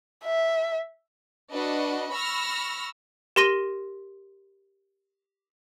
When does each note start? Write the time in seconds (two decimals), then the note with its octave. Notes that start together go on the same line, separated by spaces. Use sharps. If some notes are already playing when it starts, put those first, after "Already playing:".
0.25 E5
1.54 D4 F#4 B4 D#5
2.13 B5 C#6 E6 F6 A#6
3.36 G4 A#4 C6 A#6 D#7 G7